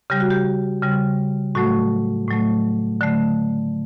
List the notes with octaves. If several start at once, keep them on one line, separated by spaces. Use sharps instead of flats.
C#3 G3 G4
F#4
G4
C#3 G3
A2 F#3 A3 F#4
A2 F#3 A3
D3 F#3 A3